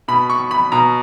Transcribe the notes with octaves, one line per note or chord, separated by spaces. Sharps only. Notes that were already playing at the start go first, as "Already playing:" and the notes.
B2 B5
C#6
B5
B2 A#5